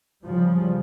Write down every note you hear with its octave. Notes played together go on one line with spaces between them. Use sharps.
C#3 F3 G3